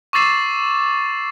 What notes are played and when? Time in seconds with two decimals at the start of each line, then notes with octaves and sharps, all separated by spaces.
0.13 C#6 D6 E6 A6 C7 E7